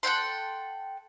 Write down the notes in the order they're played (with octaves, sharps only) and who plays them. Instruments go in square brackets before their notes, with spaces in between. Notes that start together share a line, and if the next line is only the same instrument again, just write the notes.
[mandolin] A4 F#5 G5 C6